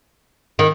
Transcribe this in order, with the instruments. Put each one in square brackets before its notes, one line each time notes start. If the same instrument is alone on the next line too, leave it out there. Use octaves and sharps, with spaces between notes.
[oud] D#3